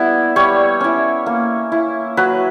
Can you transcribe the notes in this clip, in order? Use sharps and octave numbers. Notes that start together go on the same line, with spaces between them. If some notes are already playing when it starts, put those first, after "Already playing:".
Already playing: G3 B3 E4
G3 C#5
C#4 E4
A#3
E4
F#3 B4